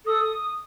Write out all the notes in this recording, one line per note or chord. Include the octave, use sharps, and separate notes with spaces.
A4 D#6